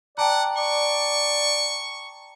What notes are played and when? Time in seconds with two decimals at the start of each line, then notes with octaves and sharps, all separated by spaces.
0.18 D5 F#5 G5 A5 A#5
0.57 D5 C#6